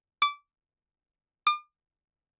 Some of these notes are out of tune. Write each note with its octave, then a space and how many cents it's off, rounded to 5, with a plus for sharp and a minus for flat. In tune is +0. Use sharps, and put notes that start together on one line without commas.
D6 -20
D6 +40